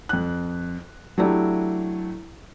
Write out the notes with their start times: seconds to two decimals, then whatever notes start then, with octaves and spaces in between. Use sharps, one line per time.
0.09 F2 F#6
1.18 F#3 A3 D4 E4 G4